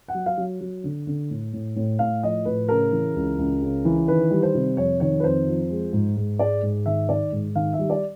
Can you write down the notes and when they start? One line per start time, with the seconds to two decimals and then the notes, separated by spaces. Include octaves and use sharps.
0.08 F#5
0.14 F#3
0.26 F5
0.37 F#3
0.61 F#3
0.84 D3
1.07 D3
1.30 A2
1.53 A2
1.76 A2
1.99 A2 F5
2.23 F3 D#5
2.45 A2 B4
2.69 C#3 A#4
2.92 E3
3.16 C#2
3.39 C#2
3.62 C#3
3.85 E3
4.08 D#3 B4
4.31 G3
4.43 C5
4.54 C3
4.77 F2 C#5
5.00 D#3 C#5
5.20 B4
5.24 F2 C5
5.47 F3
5.70 G#3
5.93 G#2
6.17 G#2
6.39 G#3 D5
6.62 G#2
6.86 D#3 E5
7.09 D#3 D5
7.32 G#2
7.55 D#3 F5
7.73 E5
7.78 G3
7.90 D5